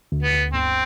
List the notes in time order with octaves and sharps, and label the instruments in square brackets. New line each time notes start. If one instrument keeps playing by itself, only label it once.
[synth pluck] D2
[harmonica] B3
[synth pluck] D2
[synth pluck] G1 [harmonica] C4